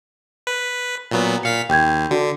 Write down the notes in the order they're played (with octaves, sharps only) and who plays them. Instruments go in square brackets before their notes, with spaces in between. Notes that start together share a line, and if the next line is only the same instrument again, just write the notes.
[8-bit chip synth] B4
A#2 F#3 B3
[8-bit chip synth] A#2 F5 B6 [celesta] C#7
[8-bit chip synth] D#2 [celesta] G5 G6 G#6
[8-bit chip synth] D3 [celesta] F#4